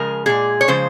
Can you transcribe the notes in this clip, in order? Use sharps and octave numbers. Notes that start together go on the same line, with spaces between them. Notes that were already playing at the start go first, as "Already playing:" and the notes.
Already playing: C#3 F3 G#3 A#4
A#2 G#3 G#4
C#5
C#3 F3 G#3 C5